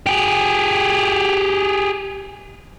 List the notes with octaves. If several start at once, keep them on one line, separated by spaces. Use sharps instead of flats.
G4 G#4